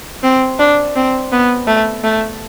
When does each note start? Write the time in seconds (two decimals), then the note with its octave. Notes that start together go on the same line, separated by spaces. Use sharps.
0.23 C4
0.59 D4
0.95 C4
1.32 B3
1.67 A3
2.03 A3